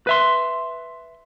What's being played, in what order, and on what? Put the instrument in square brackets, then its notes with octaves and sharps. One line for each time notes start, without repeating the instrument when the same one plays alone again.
[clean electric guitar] B4 E5 C6